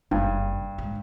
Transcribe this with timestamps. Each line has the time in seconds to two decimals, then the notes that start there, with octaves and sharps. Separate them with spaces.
0.11 F#1 G2
0.78 G#2